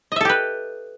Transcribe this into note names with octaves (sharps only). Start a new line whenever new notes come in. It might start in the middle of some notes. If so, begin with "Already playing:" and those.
G4 A4 B4 D#5 E5